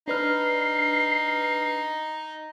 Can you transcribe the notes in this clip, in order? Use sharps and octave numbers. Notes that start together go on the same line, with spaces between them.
D4 D#4 B4 F6 C7